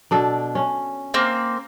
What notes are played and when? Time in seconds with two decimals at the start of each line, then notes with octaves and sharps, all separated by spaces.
0.11 B2 D4 A4
0.55 C#4
1.14 A#3 C4